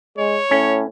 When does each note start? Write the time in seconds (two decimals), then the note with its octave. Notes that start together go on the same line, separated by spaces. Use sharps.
0.18 G#3 C#5
0.51 A2 C#4